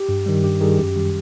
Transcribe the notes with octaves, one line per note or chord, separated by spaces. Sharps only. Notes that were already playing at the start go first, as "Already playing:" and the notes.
Already playing: G4
G2
D#3 G3
G2 G4
D#3 G3 G#4
F#2 G4
D#3 G3